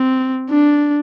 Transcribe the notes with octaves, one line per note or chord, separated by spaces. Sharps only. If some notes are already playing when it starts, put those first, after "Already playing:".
Already playing: C4
D4